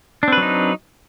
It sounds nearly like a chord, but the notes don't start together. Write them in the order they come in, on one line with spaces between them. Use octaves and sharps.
D4 C4 B4 F#3 D#4